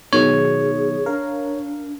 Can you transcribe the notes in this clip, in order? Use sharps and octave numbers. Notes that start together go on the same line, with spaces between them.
B2 D#3 F#3 G#4 C#5
D4 A#4 F5